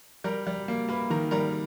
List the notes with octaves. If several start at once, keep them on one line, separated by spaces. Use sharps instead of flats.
G3 A#4 A#5
G3
A#3
A#3 B4 B5
D#3 A#4 A#5
G3 A#4 A#5